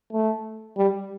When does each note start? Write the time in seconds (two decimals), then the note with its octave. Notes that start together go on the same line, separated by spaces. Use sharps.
0.13 A3
0.77 G3